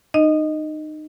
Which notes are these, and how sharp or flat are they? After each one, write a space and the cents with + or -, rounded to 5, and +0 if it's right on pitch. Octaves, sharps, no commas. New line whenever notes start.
D#4 -25 D#5 +0